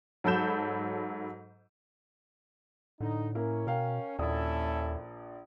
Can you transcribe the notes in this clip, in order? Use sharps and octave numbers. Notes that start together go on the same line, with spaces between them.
G#2 F#3 A4 B5 G6 E7
A2 D3 D#4
A#3 C#4 E4 A#4
B2 A#4 F5 G5
A#1 D#2 C#4 E4 A4 D5 D#6